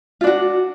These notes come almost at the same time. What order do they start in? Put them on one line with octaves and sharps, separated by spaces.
F4 D4 F#4